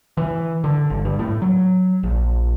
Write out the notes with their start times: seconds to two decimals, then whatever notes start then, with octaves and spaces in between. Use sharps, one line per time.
0.17 E3
0.64 D3
0.90 G1
1.05 G2
1.19 A2
1.42 F#3
2.03 A#1